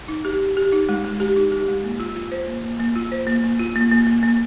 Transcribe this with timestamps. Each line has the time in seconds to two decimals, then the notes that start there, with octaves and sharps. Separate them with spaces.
0.08 D#4
0.25 G4
0.41 G4
0.57 G4
0.72 D#4
0.89 G#3
1.04 G#3
1.20 G4
1.36 D#4
1.52 G4
1.68 G#3
1.84 A#3
2.00 F4
2.16 F4
2.32 C5
2.47 A#3
2.64 A#3
2.80 A#3
2.96 F4
3.12 C5
3.27 A#3
3.44 A#3
3.59 F4
3.76 A#3
3.91 A#3
4.07 A#3
4.23 A#3